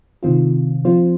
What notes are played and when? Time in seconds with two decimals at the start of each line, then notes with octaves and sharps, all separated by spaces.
0.23 C3 D#3 C4 F4
0.85 F3 C4 F4 C5